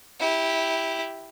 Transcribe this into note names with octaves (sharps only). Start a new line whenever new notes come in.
E4 G4